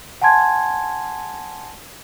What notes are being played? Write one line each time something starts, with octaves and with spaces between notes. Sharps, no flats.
F#5 G#5 A5 C6 G#6